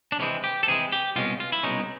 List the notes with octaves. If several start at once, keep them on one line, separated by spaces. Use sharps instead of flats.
D4
C3 E3 G#3 C4 C#4
G4
A4
C3 E3 G#3 C4 G#4
G4
C2 B2 G#3 C#4 F4
F4
E4
C2 B2 G#3 C#4 D#4